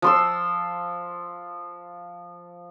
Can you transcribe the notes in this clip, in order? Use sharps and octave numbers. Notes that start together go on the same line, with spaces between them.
F3 C6 E6